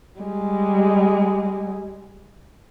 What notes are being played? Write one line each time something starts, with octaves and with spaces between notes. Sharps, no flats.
G3 G#3